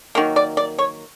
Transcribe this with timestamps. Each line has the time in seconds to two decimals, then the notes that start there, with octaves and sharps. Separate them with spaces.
0.15 D#3 F#3 A#3
0.36 D5
0.57 D5
0.79 C#5